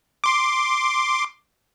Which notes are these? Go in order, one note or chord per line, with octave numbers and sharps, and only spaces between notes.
C6 D6